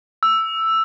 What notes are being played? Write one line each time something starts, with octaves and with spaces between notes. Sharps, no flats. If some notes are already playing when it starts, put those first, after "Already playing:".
E6